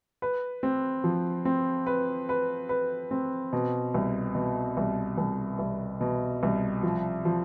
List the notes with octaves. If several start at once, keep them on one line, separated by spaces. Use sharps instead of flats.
B4
C4
F3
C4
B4
B4
B4
C4
B2
C2
B2
C2
C2
C2
B2
C2
F3
F3